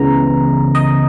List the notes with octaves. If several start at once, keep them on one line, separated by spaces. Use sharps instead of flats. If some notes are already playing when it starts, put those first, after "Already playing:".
Already playing: C#2 C#3 E3 B3 A#5
D#5